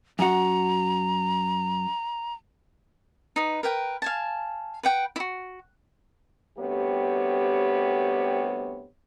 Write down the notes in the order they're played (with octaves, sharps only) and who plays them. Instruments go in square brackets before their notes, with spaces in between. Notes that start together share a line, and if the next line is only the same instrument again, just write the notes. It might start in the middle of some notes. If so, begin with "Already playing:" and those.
[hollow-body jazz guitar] F#2 F#4 [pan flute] A#5
[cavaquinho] D#4 B4
A#4 B4 G5
F5 G#5 A5
B4 F#5 G5
E4 F#4
[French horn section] D2 C3 G3 B3 G4 C#5